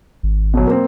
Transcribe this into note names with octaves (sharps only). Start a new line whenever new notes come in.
G#1
B2 F#3
A#3 C4